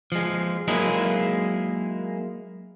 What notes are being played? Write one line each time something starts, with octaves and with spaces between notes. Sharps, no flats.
F3 G#3
F#3 G#3 A#3 D#4 E4 G#4